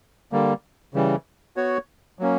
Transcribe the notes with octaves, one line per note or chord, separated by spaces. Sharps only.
D3 G3 A#3
C#3 E3 G3
B3 F#4 C#5
F#3 A#3 C#4